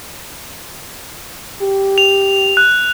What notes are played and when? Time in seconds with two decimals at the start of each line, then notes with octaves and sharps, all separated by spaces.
1.62 G4
1.98 F7
2.57 F#6